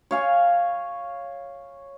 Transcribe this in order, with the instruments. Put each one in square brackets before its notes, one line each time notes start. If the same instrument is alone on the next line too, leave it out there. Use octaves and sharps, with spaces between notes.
[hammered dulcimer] C#5 F5 G#5